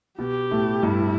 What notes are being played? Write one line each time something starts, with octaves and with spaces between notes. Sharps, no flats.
B2 B3 G4
A2 A3
G2 G3 E4